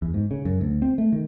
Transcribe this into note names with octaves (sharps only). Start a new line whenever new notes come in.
E2
G#2
C#3
F#2
D2
C4
A3
D#3